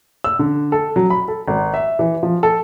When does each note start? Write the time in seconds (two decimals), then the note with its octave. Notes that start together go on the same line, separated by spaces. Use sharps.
0.24 E6
0.39 D3
0.72 A4
0.96 F#3
1.10 B5
1.28 A4
1.48 G#1
1.74 E5
1.99 E3
2.23 F3
2.43 A4